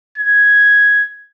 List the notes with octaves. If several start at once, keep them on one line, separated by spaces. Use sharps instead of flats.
G#6